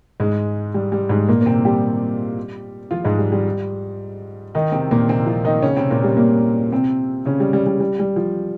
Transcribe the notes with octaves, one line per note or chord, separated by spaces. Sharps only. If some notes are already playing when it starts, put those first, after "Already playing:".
G#2 G#3
G3
G3
G#2 G#3
A#2 A#3
A#3
C3 C4
G3 G4
F3 F4
G#2 G#3
G3
G3
D#3 D#4
C3 C4
A#2 A#3
C3 C4
F3 F4
D#3 D#4
C#3 C#4
C3 C4
A#2 A#3
G3
A#2 A#3
C3 C4
C#3 C#4
G3
G3
G3
G3
G3
F3